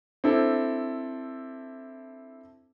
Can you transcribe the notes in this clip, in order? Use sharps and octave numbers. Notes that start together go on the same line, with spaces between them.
C4 D4 E4 A4